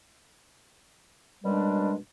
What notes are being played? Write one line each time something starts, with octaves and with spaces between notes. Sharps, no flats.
F#2 B2 G3 G#3 D4